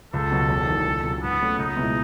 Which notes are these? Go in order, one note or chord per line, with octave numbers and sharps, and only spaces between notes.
C#2 A4
B2 F#3
E1
E2 D#3
C#2
C#3 F#3
G#2 B3
F#3 A3 C#4
C#2 D#4
B2 G#3 B3 E4